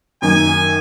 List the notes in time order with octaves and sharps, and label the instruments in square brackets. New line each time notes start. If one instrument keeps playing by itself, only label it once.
[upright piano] F#2 D#3 A#3 D#4 [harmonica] G#5